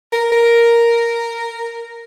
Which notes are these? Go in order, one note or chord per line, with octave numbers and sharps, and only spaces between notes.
A#4
A#4